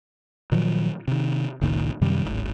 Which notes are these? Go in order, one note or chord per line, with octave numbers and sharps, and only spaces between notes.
A#2 D#3 F3 F#3
C3 D#3
F#1 C#2 A#2 D#3
F#2 C3 D#3 G3
D1 G#1